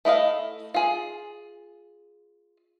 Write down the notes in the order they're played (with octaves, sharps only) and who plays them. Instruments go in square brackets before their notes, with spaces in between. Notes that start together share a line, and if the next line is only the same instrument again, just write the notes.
[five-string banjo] A3 E4 D#5 F5
F4 G#4